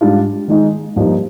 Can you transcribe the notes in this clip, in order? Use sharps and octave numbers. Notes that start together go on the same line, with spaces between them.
G#2 G3 D4 F4
D#3 G#3 D#4
G2 F3 A#3 D#4 G4